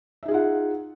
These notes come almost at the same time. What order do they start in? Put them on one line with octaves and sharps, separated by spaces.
E5 D#4 G#4 F4 F#5